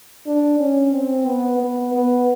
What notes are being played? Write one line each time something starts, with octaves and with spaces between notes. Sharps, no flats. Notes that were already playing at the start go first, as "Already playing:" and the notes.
D4
C#4
C4
B3
B3
B3